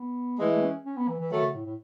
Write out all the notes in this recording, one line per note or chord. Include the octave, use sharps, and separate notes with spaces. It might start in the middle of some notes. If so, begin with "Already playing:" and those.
Already playing: B3
E3 G#3 A3
A3
C#4
C#4
B3
E3
E3
D#3 F#3 A3
C#3
A2
A2